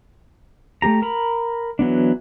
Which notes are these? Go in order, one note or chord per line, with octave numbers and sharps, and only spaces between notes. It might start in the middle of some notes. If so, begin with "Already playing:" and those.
A3 A#3 G4 A#5
A#4 A#5 B5
E3 F#3 B3 D4